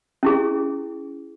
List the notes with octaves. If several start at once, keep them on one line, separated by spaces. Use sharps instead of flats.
C#4 E4 G#4